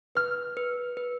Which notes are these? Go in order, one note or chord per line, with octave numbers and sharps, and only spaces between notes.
B4 F6
B4
B4